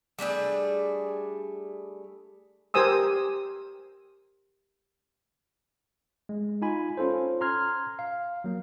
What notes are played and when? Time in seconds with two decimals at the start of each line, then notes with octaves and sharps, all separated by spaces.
0.19 G3 A3 D4 G#4
2.74 G4 A#4 C5 G#5 D#6 E6
6.29 G#3
6.62 D#4 F4 G#5 B5
6.97 C#4 F4 A4 C5
7.41 A#5 C6 F6 G#6
7.99 F5
8.44 F#3 A#3